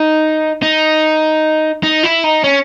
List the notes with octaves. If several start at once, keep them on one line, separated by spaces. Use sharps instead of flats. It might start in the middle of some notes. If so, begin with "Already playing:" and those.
Already playing: D#4
D#4
D#4
E4
D#4
C#4